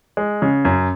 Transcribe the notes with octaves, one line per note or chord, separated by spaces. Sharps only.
G#3
C#3
F#2